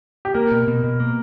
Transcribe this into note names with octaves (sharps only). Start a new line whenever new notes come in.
G4
A#3 A#4
B2
B2
B2
A#3